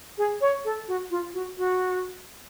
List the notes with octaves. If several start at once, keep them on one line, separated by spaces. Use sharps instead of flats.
G#4
C#5
A4
F#4
F4
F#4
F#4